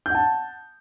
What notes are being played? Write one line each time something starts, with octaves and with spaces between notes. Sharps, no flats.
F#5 A5 G6